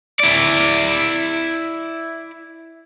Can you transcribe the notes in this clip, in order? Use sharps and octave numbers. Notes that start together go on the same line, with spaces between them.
E4 D5